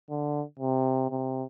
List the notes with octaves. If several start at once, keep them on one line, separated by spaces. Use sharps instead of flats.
D3
C3
C3